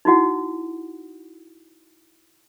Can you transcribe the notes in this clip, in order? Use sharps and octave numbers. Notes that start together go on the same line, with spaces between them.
D#4 E4 F#4 F#5